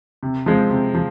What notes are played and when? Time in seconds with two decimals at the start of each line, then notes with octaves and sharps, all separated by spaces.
0.23 C3
0.46 F3 G#3 C4
0.70 C3
0.94 F3